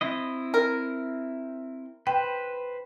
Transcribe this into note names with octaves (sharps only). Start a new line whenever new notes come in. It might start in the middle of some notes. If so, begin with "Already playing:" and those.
C4 E4 D#5
A#4
B4 C5 G5